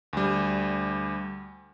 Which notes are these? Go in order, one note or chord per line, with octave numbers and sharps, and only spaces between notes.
D2 G3